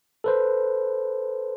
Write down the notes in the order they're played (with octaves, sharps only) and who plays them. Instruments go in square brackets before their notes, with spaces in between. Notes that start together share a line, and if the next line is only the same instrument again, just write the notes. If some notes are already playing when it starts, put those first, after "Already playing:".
[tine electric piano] A4 B4 C5